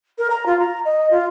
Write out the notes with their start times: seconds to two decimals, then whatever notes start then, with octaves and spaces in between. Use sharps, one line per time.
0.19 A#4
0.30 A#5
0.46 F4
0.60 A#5
0.85 D#5
1.11 F4